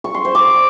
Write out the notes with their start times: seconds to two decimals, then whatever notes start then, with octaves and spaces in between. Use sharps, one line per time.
0.04 C#6
0.14 C6
0.25 C5
0.35 D6